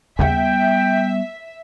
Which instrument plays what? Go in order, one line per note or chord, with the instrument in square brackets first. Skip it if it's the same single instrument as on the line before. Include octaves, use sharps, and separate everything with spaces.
[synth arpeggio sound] D#2 C#3 F#5 [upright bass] G3 B3 [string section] E5 [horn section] G5